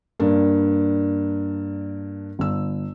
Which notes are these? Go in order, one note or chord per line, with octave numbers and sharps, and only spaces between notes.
G2 A#3 D4
G1 E6